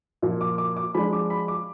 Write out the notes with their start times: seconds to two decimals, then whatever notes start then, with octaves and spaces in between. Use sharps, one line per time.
0.22 A#2 F3 A#3
0.41 D6
0.58 D6
0.77 D6
0.95 F3 G#3 D4 B5
1.13 D6
1.30 B5
1.48 D6